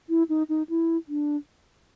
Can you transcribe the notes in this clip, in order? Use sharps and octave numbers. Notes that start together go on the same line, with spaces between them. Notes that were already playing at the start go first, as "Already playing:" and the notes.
E4
D#4
D#4
E4
D4